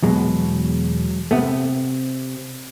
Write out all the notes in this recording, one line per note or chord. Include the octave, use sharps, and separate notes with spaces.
E2 B2 F#3 G#3
C3 A3 B3